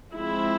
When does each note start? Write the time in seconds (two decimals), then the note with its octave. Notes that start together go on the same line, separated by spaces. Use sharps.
0.14 F3 G#3 C4 E4